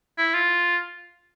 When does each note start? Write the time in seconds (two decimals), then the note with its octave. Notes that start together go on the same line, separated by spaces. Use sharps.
0.18 E4
0.34 F4